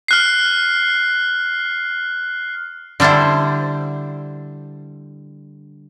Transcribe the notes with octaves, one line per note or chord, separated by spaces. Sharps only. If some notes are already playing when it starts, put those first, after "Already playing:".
F6 F#6 C7
D3 G3 D4 E4 C5